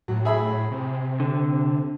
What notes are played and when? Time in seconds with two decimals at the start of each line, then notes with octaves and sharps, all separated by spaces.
0.08 A2 F#3
0.25 G#4 E5 B5
0.71 C3
1.20 D3